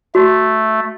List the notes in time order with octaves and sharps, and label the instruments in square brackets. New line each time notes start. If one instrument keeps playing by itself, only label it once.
[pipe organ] A3 [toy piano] F#4